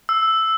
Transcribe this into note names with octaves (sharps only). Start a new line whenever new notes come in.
E6